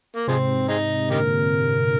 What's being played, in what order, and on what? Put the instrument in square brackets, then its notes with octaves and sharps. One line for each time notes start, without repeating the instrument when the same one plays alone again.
[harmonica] A#3
[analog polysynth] G#2 C3 [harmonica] F3 G#3 C4
[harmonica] G#3 C4 D#4
[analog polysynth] A#2 D3 [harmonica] D#4 G4 A#4